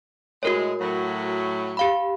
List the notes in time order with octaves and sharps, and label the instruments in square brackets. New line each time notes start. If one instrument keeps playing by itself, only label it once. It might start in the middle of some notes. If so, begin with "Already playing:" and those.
[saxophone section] A2 G#3 [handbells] F#4 A#4 C#5
[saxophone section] A2 F#3
[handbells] G4 F5 B5